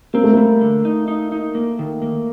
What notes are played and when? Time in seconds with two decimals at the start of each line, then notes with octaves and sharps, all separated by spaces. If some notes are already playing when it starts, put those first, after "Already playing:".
0.14 A#3 C4
0.24 A3
0.33 G3 A#3
0.61 D3
0.85 D#4
1.08 D#4
1.32 D#4
1.55 A#3
1.79 D#3
2.02 A#3